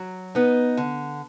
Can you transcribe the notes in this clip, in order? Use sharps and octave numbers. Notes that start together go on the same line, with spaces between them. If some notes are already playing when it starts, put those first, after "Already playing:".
Already playing: F#3
B3 D#4
D3